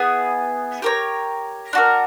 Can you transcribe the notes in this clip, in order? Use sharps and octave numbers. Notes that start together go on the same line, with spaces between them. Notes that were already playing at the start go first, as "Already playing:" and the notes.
Already playing: B3 E4 G#4
G4 A#4 C#5
D4 F#4 A#4